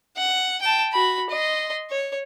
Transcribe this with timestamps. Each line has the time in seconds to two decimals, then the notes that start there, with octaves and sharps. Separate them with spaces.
0.17 F#5
0.61 G5 A5
0.93 F#4 B5
1.30 D#5 C6
1.90 C#5